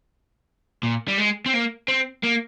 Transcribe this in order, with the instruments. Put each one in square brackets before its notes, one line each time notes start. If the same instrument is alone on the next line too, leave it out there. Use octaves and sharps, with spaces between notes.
[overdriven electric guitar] A#2
G3
G#3
C4
A#3
C4
A#3